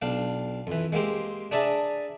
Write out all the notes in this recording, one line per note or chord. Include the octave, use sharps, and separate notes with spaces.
B1 D4 F5
F2 E3
G#3 A#3 C4 G4
D4 G#4 D5 E5 A5 A#5